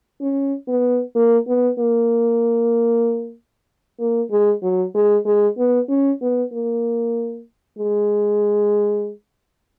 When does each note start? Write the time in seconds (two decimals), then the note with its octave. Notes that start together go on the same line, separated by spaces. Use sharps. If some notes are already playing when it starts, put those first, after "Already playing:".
0.21 C#4
0.68 B3
1.15 A#3
1.47 B3
1.78 A#3
3.99 A#3
4.31 G#3
4.62 F#3
4.95 G#3
5.26 G#3
5.58 B3
5.89 C#4
6.21 B3
6.52 A#3
7.78 G#3